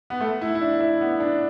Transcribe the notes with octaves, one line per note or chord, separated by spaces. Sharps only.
B3
A3
E4
E4
D4
E4
B3
D4